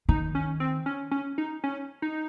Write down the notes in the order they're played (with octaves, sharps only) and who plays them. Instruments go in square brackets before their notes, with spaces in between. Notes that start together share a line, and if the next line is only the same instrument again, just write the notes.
[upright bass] D#3 [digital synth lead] D#4
[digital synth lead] C#4
C4
C#4
C#4
D#4
C#4
D#4